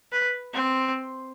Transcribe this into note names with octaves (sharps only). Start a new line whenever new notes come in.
B4
C4